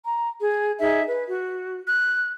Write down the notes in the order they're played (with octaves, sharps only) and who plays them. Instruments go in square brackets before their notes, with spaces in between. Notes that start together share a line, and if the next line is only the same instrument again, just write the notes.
[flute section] A#5
G#4
D#4 G#4 E5
B4
F#4
F#6